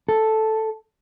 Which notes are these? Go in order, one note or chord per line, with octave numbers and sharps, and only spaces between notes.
A4